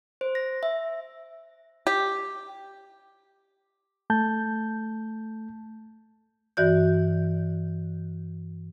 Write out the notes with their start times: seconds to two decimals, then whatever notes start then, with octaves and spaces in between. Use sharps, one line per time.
0.21 C5
0.35 A#6
0.63 E5
1.87 G4
4.10 A3 A5 G6
6.57 G2 E3 F#4 D5 G6